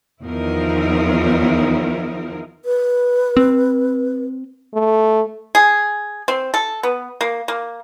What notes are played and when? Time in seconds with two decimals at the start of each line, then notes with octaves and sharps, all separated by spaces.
0.23 E2 D#3 F3 D#4 E4 A#4
2.65 B4
3.37 C4
4.74 A3
5.55 G#4
6.28 C4
6.54 A4
6.83 B3
7.21 A#3
7.48 A#3